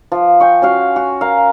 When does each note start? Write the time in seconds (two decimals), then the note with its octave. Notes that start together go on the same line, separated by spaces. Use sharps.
0.12 F3
0.40 G5 G#5 C#6
0.62 C#4 F#4 F5
0.96 F#4
1.21 A#4 F5